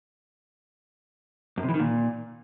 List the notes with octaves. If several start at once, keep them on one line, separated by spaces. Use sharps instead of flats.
F#2
C3
E3
D#3
A#2